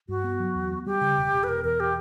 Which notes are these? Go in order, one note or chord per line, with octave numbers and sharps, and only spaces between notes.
G2 F#4
B3
F#3
E2
B3
G3 G4
C#3
E1
E1
B4
B2 A#4
E2 A#4
G4